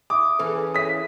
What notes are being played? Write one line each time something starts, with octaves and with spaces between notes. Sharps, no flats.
E5 D6 D#6
E3 C#4 G#4 A4 B4
C#5 E5 D#6 B6